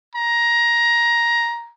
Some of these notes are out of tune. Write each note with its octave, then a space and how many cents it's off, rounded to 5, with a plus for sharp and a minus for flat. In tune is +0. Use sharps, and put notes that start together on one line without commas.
A#5 +15